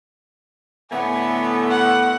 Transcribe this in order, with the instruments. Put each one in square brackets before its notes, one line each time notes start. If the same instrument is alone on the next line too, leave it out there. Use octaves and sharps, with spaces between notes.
[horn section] A2 D3 A3 [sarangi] B3 [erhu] G#5
[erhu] F#5